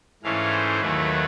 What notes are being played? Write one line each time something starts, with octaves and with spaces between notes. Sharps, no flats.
G#2 E3 A3 C#4 F5
C5
D#2 D#3 F#3 A3 B4